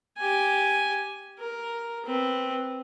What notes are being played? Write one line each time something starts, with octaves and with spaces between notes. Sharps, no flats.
G4 G#5
A#4
C4 B4